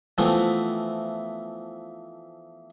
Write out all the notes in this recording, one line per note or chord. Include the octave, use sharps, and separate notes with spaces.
E3 F3 A3 B3 C4